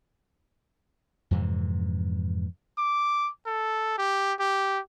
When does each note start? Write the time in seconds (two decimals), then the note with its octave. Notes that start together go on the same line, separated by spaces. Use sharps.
1.31 F2 G#2 C3 E3
2.78 D6
3.46 A4
3.98 G4
4.40 G4